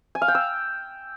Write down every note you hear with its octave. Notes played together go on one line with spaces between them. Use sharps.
G#5
F5
G5
E6